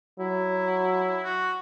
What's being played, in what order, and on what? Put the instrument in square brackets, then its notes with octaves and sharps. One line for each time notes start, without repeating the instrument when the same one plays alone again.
[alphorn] F#3 [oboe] E4
[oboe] F#4